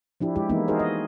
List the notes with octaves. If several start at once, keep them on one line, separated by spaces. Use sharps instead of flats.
F3 D4 E4 G4
G#3 E4 G4
E3 G#3 A#3 B3 D#4 E4
D#4 F#4 G#4 A#4 C5
D#5